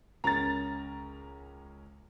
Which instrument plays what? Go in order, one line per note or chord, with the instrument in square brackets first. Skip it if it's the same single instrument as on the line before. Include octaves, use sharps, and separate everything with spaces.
[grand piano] C#2 C#4 A#4 [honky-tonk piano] A#5 A6